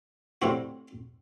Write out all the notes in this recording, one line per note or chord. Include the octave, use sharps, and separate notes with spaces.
A2 G3 C4 F#4